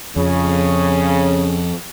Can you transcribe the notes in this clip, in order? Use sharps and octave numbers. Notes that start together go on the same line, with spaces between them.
F2 C#3